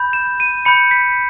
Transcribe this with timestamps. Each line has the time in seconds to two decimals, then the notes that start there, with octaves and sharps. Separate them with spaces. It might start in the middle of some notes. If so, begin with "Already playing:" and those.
Already playing: B5 G6
0.13 E7
0.40 D#7
0.65 B5 G6 C#7
0.91 B6